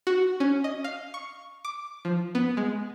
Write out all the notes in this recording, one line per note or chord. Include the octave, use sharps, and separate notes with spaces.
F#4
C#4
D#5
F5
C#6
D6
F3
B3
G#3